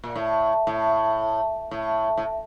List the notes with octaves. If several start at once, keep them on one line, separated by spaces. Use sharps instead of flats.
A#2
A2
A2
A2
A2